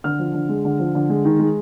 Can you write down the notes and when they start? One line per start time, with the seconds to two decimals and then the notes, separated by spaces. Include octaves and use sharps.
0.04 D3 F6
0.19 F3
0.34 D3
0.49 G#3
0.65 D3
0.79 F3
0.95 D3
1.10 G#3
1.25 D#3
1.39 G#3